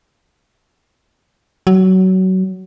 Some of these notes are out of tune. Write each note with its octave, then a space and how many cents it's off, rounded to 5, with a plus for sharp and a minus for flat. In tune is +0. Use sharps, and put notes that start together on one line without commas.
F#3 +20